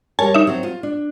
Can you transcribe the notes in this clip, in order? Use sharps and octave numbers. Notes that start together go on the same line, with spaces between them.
G3 A#4 C#5 G#5 A5
D#4 E5
F#3 C4
F4
D4